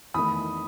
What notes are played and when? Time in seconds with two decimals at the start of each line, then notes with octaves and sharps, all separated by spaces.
0.14 E2 D#3 A3 B5 D#6